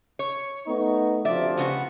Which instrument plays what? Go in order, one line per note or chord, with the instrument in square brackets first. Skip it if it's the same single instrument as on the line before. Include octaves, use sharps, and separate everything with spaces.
[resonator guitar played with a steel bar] C#5
[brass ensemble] A3 B3 D#4
[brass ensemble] D2 C3 F3 [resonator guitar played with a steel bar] D5 E5
[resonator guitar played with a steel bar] C#3 B3 F#4